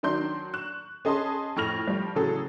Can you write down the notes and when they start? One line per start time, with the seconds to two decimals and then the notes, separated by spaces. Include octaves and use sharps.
0.03 D#3 F#3 D4 C6 G6
0.54 C#6 F#6 E7
1.05 C#4 G#4 D#5 A5 B5 C6
1.56 F2 A2 C#6 F6 A#6 F7
1.88 F3 G3
2.15 A2 C#3 E3 F#3 G#4 A4